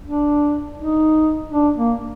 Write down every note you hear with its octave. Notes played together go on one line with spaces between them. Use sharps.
D4
D#4
D4
A#3